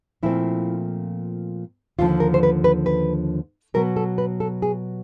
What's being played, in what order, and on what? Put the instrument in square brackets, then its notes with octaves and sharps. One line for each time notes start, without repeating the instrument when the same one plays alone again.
[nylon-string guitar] A#2 F3 A3 C4 E4
D#2 D3 F3 F4
A#4
C5
B4
B4
B4
B2 F#3 B3 A#4
A4
B4
A4
G#4